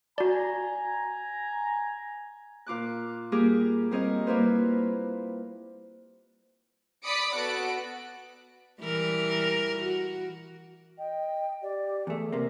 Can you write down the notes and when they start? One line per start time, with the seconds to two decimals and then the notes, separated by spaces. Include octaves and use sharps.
0.18 F#4 D5 G#5 A#5
2.66 A#2 F4 D6 F#6
3.32 G3 A#3 G4 G#4 A#4 D6
3.91 G3 C4 A#4 C#5 D#5
4.27 G3 A#3 E4 F4 B4 C5
7.04 D5 B5 D6 D#6 C#7 D7
7.34 B3 F#4 A4 F#6 D7
8.81 E3 G3 A#4
9.79 F#4
10.98 D#5 G5
11.62 G4 D5
12.07 E2 A3 G#4
12.32 C3 A#3 C4